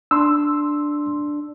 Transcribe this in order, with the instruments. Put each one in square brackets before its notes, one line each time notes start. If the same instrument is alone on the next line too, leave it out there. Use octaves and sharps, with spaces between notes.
[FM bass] D4 [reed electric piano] C6 E6